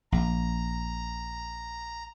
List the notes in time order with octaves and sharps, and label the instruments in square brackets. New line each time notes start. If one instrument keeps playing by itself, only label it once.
[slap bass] A#1 [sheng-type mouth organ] A#5